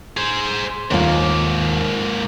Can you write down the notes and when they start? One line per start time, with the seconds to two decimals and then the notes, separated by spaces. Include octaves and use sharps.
0.17 G#4 C5
0.91 D#2 G#2 A#3 F4